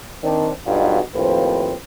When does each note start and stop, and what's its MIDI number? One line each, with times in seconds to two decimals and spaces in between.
0.23 0.49 51
0.23 0.49 60
0.23 0.49 62
0.67 1.00 35
0.67 1.00 43
0.67 1.00 47
0.67 1.00 63
0.67 1.00 65
0.67 1.00 66
1.15 1.74 39
1.15 1.74 45
1.15 1.74 53
1.15 1.74 60
1.15 1.74 71